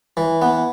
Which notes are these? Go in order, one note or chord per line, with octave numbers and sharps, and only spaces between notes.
E3
B3